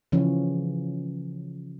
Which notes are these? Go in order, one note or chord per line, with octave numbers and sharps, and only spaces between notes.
C#3 E3 F3 C#4